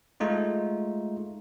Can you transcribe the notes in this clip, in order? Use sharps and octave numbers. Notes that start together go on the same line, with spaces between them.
G#3 A3 D#4 F4